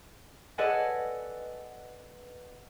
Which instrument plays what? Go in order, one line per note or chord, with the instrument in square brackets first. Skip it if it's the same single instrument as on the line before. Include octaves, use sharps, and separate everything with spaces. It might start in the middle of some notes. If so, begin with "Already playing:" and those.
[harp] A4 B4 D5 D#5 F#5 G#5